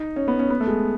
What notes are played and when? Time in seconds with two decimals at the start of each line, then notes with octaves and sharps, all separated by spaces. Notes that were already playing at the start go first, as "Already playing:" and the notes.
Already playing: D#4
0.16 C#4
0.28 B3
0.39 C#4
0.50 B3
0.60 A3
0.67 G#3